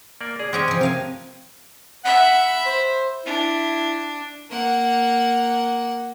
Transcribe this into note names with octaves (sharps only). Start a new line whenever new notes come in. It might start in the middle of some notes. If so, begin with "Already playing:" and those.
A#3 D5
G#4 D5
G#3 C4 C#4 G4 C5 G#5
C3 F3
C4 A#4 F5 G#5
E5 F#5 B5
C5
D4 E4
A#3 F#5